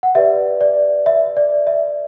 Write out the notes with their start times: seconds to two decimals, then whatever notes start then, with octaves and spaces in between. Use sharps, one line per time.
0.03 F#5
0.15 G4 B4 D5 E5
0.61 D5
1.06 E5
1.37 D5
1.67 E5